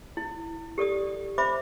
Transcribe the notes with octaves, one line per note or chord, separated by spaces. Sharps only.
E4
G4 A4 D5 D#6
C5 E5 B5 D6